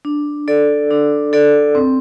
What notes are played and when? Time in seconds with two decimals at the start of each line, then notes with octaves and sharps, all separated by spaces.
0.05 D4
0.48 A4 D5
0.91 D4
1.33 A4 D5
1.75 C4